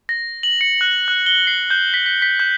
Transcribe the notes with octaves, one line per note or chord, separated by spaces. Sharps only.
A#6
F#7
C#7
F#6
F#6
G7
C7
G6
B6
B6
B6
G6